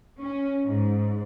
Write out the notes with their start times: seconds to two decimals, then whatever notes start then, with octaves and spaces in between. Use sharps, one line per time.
0.21 C#4
0.65 G#2